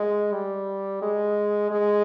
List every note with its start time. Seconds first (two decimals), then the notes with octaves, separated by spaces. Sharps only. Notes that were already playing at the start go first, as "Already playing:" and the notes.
Already playing: G#3
0.33 G3
1.02 G#3
1.71 G#3